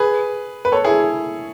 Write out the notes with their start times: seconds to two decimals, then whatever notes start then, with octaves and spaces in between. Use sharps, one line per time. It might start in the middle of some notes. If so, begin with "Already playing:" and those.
Already playing: G#4 B4
0.65 B4
0.72 A4 C#5
0.85 E4 G#4